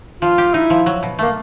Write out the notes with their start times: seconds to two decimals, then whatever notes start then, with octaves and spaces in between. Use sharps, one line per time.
0.22 F3 F4
0.38 G4
0.54 D#4 E4
0.70 F3
0.86 F#3
1.03 B2
1.19 A3 A#3